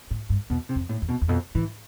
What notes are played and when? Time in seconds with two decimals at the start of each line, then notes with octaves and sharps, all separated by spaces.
0.11 A2
0.30 G2
0.50 E2 B2
0.69 C3
0.76 F2
0.89 A2
1.02 E2
1.09 B2
1.21 E2
1.28 F2 B2
1.55 A2 E3